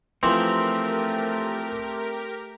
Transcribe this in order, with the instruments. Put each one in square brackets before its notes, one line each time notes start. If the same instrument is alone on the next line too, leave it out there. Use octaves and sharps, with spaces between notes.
[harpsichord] E3 F3 [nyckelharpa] A3 [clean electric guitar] C4 [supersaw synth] G4 A#4